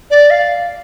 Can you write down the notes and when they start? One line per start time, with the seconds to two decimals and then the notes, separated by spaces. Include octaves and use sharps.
0.11 D5
0.30 F5